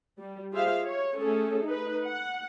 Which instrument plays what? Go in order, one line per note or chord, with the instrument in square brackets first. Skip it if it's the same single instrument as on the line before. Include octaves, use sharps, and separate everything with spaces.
[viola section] G3
F4 G4 G#4 C5 E5 F5
C#5
A3 C#4 G#4 A4
D#4 B4
F#5